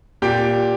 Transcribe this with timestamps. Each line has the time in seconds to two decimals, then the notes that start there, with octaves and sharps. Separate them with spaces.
0.22 A#2 G4 G5